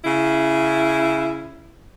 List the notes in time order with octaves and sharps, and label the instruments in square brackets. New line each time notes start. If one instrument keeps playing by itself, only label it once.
[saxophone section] C#3 E4